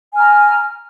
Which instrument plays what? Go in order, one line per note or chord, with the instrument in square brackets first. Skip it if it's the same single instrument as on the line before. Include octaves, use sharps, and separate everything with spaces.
[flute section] G#5
F6
A#5